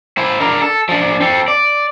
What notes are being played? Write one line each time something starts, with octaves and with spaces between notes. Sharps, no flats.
E4 C5
D4 A#4
A4
F3 D4
C4 A4
D5